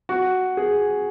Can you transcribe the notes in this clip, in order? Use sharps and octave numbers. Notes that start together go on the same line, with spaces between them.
F#4
G#4